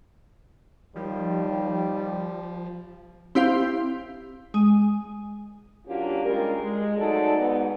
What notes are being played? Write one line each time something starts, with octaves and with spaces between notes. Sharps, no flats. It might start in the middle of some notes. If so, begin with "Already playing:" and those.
D#2 F3 G3
C4 E4 G4 C5 F5
G#3
F#3 A#3 C#4 D4 F4 G4
C#3 G3 G#3 F4 A#4
G#3
F#3 G#3 A3 D#4 A4 D5
G#2 B3